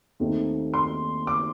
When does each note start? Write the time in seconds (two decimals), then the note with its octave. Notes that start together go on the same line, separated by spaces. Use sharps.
0.20 D#2 D#3 A3 C4
0.74 C6
1.27 D6